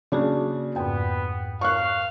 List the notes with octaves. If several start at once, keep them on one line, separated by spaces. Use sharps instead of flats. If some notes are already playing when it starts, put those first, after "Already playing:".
C#3 A#3 D4 F#4 G#4
F2 G#2 B3 G5
F5 C#6 F#6